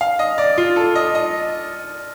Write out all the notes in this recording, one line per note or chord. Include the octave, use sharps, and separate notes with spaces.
F5
D#5
D5
F4
A4
D#5
D#5